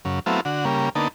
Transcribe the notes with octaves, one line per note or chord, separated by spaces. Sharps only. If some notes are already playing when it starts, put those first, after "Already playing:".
F#2 C#3
F#3 A3 B3 C4 E4 F4
D3 F#4
C#3 G3 A#3
D3 A#3 B3 D#4 A5